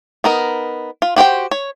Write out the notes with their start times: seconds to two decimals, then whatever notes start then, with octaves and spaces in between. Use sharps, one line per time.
0.24 B3 D#4 A#4
1.02 F4
1.16 F#4 G4 C5 G5
1.51 C#5